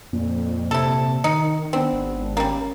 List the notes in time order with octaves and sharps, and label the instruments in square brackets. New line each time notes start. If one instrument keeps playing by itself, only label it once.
[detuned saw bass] F2 [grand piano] A#2
[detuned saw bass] C3 [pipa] E4 A4
[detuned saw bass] D#3 [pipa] D#4 [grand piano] C#7
[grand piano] B3 D4 [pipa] C4
[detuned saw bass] G#1
[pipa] G3 A#3 [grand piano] C#4